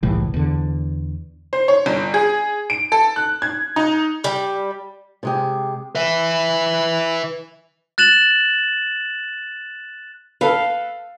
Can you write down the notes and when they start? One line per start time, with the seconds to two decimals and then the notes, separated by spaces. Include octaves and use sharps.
0.03 F#1 C2 A2 E3
0.34 E2 D3
1.53 C5
1.68 C#5
1.86 G1
2.14 G#4
2.70 D7
2.92 A4
3.16 F#6
3.42 G#6
3.76 D#4
4.24 G3
5.23 C3 G#3 G4
5.95 B4 E5
7.98 F#6 A6 E7 F#7
10.41 A4 B4 F5